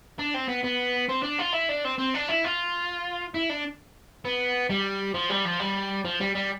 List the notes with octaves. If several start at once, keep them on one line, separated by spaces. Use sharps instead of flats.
D4
C4
B3
B3
C4
D4
F4
E4
D4
C4
C4
D4
E4
F4
E4
D4
B3
G3
F3
G3
F3
G3
F3
G3
G3